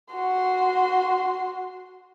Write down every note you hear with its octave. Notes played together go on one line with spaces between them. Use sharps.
F#4 C6